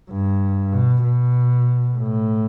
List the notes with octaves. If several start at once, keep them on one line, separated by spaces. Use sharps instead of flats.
G2
B2
B2
A2